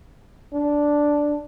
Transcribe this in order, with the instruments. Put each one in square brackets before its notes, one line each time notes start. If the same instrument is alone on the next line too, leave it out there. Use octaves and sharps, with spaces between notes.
[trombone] D4